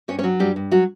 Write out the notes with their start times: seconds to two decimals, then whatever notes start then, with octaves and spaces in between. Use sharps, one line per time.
0.08 G2 C#4 C#5
0.19 C#4 C#5
0.24 F#3
0.39 G2 G3 G4
0.56 G2
0.71 F#3 F#4